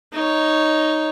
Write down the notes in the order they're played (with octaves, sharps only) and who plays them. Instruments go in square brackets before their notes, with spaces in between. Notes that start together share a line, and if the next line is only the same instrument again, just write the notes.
[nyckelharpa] D#4 C#5